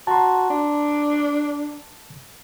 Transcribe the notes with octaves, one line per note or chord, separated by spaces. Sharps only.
F#4 A5 A#5 C6
D4